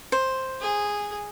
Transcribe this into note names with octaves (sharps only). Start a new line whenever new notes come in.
C5
G#4